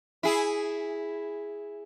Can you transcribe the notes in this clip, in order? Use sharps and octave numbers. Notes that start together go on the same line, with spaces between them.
E4 G#4